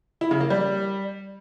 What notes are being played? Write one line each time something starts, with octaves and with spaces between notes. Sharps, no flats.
E4
C#3
A#3
G3